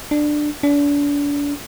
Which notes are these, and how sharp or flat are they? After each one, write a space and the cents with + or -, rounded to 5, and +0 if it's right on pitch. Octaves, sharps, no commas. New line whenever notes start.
D4 +15
D4 -35